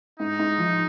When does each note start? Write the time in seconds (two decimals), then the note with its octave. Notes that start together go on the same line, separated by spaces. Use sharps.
0.19 G#2 D#4
0.39 G#2
0.58 F3